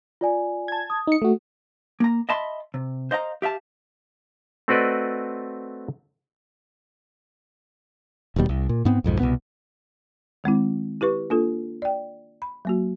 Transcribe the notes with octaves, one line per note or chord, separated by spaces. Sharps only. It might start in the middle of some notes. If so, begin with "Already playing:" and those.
F4 D5 G#5
A5 G#6
D#6
D#4 C#7
A3 F#4
A#3 A#5
D#5 E5 A5 B5 C6
C3
C5 D#5 F5 A#5
G4 E5 F5 A5
A3 C4 F#4 B4 D5 D#5
D#1 D#2 B2 G3
C2
A#2
G#2 B3 C4
B1 F2 G#2
C2 F2 B2 B3
D#3 G#3 C4 E4
E4 G4 B4 C#6
A#3 D4 F4 A4
D5 G5
B5
F#3 A#3 F#4